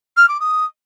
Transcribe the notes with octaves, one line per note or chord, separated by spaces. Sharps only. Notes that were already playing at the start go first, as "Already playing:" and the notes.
F6
D6
D#6